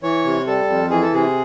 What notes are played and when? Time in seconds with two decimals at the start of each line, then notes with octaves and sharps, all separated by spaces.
0.03 E3 C#5
0.25 C3
0.47 G3 A4
0.69 F2
0.90 E3 G#4
1.02 A4
1.13 C3 G#4